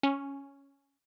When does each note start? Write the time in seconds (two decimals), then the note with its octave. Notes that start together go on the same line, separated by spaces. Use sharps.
0.03 C#4